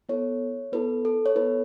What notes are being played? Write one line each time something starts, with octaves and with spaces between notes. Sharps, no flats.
B3 E4 A4 C#5
B3 E4 A4 B4
A4
C#5
B3 E4 A4 B4